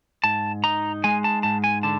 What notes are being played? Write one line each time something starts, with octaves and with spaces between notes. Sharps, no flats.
G#2 A5
D#4 A#5
G#3 G#5
A5
G#2 A5
G#5
D3 A5